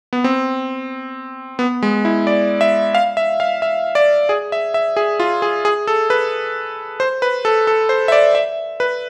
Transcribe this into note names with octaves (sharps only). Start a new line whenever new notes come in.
B3
C4
B3
G#3
E4
D5
E5
F5
E5
F5
E5
D5
G#4
E5
E5
G#4
F4
G#4
G#4
A4
B4
C5
B4
A4
A4
C5
E5
D5
E5
B4